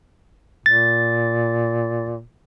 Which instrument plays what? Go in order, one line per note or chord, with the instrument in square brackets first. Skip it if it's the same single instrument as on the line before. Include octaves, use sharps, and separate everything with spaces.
[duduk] A#2 [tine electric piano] A6